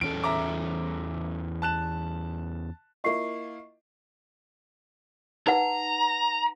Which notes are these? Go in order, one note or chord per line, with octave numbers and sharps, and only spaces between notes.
E2 C#4 A4 D7
E5 A#5 D6
A5 F#6 E7
A#3 E4 F4 D#5 C#6 C7
D#4 B4 F#5 A#5